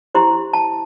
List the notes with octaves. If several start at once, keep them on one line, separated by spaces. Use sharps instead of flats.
E4 G4 C5 C6
A5